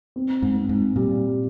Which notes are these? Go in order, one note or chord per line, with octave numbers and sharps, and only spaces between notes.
C4
G#2
C4
G#2
A#2 G3